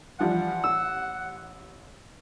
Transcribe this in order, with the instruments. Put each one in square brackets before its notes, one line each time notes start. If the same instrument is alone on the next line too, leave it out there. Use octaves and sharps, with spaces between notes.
[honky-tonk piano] E3 F3 G3 [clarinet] F#5
[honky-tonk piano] A1 [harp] E6